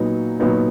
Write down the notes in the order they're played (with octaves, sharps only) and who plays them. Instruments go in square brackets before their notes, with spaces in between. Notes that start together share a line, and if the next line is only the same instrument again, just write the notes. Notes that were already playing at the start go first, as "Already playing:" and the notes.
Already playing: [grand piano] A#2 F#3 B3 D#4
A#2 F#3 B3 D#4